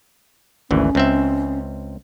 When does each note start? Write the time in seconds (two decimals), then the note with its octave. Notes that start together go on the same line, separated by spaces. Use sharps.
0.71 G#1 D2 E3 C#4
0.95 C#2 C4 E5